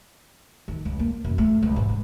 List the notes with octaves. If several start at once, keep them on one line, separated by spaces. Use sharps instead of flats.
D#3
C#2
A#3
F#2
A3
C#2
G#2
D3